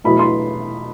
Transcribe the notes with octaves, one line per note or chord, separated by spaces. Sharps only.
E2 B2 F#3 A3 B5
C6